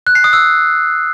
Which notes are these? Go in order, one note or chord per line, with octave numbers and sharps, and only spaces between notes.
F#6
C7
D#6
E6